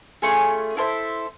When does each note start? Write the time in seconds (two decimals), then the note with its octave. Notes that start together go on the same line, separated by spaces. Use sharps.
0.22 A3 C#4 F4 G#4
0.77 E4 A4 C5 E5